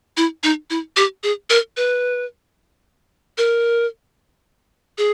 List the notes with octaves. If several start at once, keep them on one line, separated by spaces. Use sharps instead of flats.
E4
D#4
E4
G4
G#4
A#4
B4
A#4
G#4